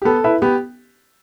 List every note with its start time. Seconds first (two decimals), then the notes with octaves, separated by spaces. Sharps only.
0.02 G4
0.05 B3 A4
0.24 E4 B4 E5
0.42 B3 G4